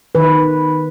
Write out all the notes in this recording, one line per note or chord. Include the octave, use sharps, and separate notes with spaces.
D#3 B4